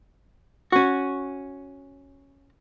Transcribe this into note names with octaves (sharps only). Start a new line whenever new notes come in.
C#4 F#4